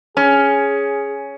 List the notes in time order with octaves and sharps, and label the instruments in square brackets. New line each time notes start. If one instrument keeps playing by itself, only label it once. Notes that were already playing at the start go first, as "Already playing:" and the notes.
[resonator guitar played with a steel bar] C#4 [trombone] G#4